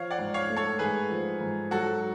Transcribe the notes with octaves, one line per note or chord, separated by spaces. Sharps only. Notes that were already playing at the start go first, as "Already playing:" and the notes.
Already playing: F3 C#5 F5
D5 F#5
G#2
C#5 F5
A3
A4 C#5
G#2 G#4 B4
F3
G#2
F#3 F#4 A4